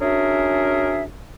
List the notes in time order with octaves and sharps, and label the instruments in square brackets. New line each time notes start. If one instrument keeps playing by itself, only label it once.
[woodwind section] C#4 D4 F#4 G#4 A#4 E5